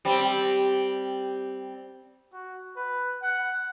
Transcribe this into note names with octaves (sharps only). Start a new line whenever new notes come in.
G3 C4
F#4
B4
F#5